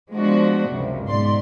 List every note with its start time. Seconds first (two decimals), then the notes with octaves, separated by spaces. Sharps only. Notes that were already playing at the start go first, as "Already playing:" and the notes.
0.12 F3 G#3 B3 D4 F#4
0.72 C#2 F#2 C3
1.07 G#2 B2 D5 C6